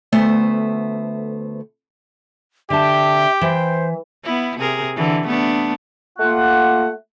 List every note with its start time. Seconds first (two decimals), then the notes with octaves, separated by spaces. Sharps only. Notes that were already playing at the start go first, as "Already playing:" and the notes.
0.12 D2 A3 B3 C5 E5
2.70 D3 G4 E5 G5 A5
3.41 E3 C5
4.24 B3 E4
4.59 C3 G#4 A#4
4.97 D3 E3
5.28 A3 B3 D4
6.18 A3 A#3 F4 F#5